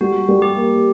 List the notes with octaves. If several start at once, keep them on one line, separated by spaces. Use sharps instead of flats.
G3 F#4
G3
G4
A#3